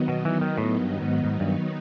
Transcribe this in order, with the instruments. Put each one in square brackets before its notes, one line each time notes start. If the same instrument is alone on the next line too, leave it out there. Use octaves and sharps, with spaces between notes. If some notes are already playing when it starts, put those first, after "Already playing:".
Already playing: [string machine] D#3 F#3 B3 D#4
[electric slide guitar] B2
E3
D#3
A2
G2
G#2
G#2
G2